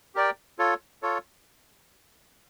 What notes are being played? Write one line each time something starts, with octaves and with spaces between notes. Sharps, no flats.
G4 A#4 D5 G5
F4 A4 C#5
F4 A4 C#5